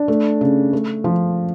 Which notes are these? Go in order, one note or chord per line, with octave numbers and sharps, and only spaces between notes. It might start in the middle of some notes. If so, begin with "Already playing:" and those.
Already playing: D4
A3
C#3
A3
F3